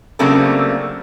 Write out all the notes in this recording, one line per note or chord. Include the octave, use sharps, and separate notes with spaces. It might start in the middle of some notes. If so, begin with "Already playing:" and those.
C#3 F#3 A3 A#3 C4 D4